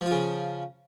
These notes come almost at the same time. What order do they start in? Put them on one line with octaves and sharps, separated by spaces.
F3 F4 C#3